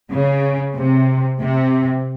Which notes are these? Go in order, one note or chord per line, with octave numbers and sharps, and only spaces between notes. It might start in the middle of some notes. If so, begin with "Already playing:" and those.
C#3
C3
C3